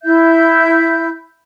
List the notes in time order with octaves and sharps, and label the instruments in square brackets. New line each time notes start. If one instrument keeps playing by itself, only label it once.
[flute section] E4 E5 G6